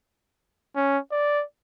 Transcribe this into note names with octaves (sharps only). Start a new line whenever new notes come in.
C#4
D5